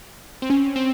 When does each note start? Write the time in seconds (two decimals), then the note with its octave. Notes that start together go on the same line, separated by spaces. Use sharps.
0.42 C4
0.50 C#4
0.76 C4